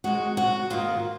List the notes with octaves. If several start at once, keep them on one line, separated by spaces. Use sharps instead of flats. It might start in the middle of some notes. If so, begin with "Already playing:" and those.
C3 D#3 G#3 F#4
F#4
G#2 D#3 A#3 F4